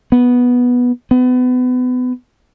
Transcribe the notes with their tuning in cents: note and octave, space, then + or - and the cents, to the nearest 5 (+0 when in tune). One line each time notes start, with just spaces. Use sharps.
B3 -10
B3 +30